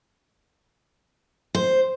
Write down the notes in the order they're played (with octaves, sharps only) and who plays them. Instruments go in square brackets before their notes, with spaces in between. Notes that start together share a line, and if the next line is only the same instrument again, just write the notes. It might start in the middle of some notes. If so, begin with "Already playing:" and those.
[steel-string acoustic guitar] C5